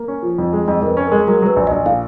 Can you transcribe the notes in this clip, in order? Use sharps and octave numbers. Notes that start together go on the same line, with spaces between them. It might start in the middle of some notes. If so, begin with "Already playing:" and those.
Already playing: A#3
C#4
F3
F2
G#3
F2 D#5
F2 A#4 B4
C#4
A#4
G#3
F#3 A#4
F#3 B4
A#1
D#5
A#1
A#2 F5